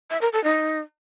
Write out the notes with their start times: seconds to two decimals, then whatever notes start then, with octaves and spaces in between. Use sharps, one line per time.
0.11 E5
0.22 A#4
0.33 A4
0.44 D#4